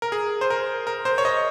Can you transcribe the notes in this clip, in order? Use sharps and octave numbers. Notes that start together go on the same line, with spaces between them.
A#4
G#4
C5
A#4
A#4
C5
C#5
D#5